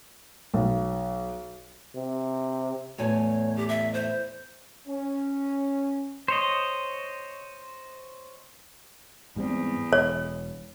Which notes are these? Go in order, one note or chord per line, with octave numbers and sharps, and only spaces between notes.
B1
C3
E2 A2 C#5 G#5
G4
E5
C5
C#4
C5 C#5 D#5
E2 G#2 G3 C4
E1 C#5